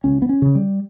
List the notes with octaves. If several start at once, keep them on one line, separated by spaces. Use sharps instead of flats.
C#2 C#4
B3
C#4
C#3
G3